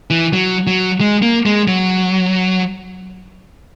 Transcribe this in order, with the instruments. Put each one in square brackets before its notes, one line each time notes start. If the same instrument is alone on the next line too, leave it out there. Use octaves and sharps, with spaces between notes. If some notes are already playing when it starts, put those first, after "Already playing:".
[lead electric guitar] E3
F#3
F#3
G#3
A#3
G#3
F#3